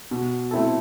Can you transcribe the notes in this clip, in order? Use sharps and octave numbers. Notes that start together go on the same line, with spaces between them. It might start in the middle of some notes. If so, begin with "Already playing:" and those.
B2
A3 C4 E4 A4